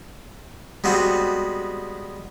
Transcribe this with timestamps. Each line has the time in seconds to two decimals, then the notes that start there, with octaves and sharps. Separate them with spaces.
0.84 G3 G#3 B3 C4 F#4